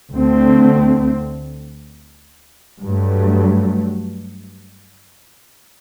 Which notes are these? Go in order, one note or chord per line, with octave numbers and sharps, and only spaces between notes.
D2 D3 A3 C4
G2 F#3 A3